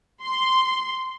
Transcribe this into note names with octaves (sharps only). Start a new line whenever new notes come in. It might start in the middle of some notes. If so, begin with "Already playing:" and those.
C6